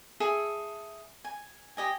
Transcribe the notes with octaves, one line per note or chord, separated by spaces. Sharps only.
G#4 A4 E5
G#5
G4 D#5 G#5